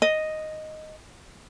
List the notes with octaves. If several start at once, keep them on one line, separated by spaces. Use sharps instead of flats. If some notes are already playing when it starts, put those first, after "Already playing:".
D#5